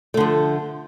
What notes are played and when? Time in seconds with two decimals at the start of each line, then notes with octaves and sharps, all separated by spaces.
0.14 A3
0.17 D3
0.20 F3